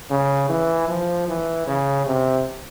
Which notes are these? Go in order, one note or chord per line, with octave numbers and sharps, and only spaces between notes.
C#3
E3
F3
E3
C#3
C3